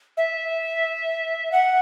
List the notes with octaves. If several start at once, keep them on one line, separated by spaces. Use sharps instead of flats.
E5
F#5